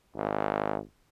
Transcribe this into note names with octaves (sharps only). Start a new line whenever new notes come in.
G#1